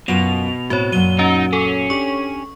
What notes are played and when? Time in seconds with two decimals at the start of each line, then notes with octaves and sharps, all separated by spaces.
0.08 F#2 B2 F4 F5 F7
0.70 A2 C4 F#4 C#5
0.92 F#2 A#2 F#3 D#7 G7
1.19 C#4 D#4
1.53 C#4 A4
1.90 D4 G4 C#6